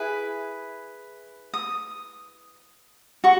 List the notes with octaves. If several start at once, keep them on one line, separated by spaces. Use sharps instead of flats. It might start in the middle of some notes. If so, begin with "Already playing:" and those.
Already playing: E4 G#4 B4
D#6
F#4 C#6